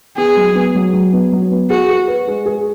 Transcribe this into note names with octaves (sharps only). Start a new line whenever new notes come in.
B3 G#4
F#3
B3
F#3
F#3
B3
F#3
B3
F#4 G#4
G#4
B4
G#3
G#4